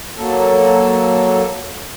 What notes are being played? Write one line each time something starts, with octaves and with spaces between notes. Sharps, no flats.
F#3 A#3 A4